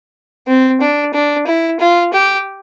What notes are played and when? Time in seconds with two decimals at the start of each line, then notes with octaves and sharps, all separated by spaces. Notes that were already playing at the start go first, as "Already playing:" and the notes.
0.47 C4
0.81 D4
1.14 D4
1.46 E4
1.80 F4
2.13 G4